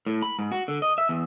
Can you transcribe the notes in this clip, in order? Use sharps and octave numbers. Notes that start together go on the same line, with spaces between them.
A2
B5
G#2
F#4
D3
D#5
E5
E2